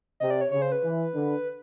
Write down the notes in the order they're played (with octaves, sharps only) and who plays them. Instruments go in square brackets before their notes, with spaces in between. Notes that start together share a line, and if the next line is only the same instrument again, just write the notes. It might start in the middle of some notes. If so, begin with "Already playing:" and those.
[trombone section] C3 [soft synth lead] D#5
[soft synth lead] D5
C#5
[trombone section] C#3 [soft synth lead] C#5
[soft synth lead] C5
B4
[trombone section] E3
D3